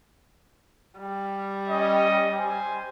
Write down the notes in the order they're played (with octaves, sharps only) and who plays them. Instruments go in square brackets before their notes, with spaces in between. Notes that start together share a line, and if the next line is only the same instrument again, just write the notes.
[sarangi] G3
[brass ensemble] C#4 D#5
C5 G#5